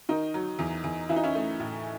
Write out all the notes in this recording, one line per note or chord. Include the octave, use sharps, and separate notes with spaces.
D#3 D#4
F#3
E2
E2
E3 E4
D#4
C#4 E4
A3
A2